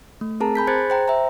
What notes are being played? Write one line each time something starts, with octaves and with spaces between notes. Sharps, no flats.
A3
C4 G#4 A#4 A5 A#5
G#5 B5 G6 B6
G#4 C5 F#6 G#6 A6 C#7
C5 G5 A#5
E5 G5 A#5